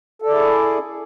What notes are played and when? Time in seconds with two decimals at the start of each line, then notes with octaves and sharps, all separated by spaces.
0.22 A4
0.26 D5
0.30 E4
0.34 G#4